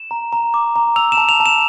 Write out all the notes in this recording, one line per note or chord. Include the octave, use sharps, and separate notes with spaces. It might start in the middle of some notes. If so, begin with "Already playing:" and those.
Already playing: E7
A#5
A#5
D6
A#5
E6 F7
E7
A5
F7
A5
E7